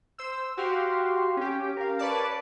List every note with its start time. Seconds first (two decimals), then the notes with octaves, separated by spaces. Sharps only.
0.18 C5 E6
0.57 F#4 G4 F5 C6
1.37 C#4 G4
1.77 A#4 F5
1.99 B4 C#5 D5 A5